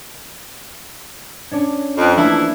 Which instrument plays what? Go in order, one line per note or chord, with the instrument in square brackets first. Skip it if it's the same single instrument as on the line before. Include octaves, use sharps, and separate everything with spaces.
[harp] C#4 D4 C#5
[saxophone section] F2
[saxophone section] E3 F3 E4 [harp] A3 A#3 D4